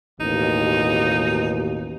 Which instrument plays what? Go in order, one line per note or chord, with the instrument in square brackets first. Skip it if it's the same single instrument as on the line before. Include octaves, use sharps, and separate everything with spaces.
[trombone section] A1 D#2 B2 [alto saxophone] D#4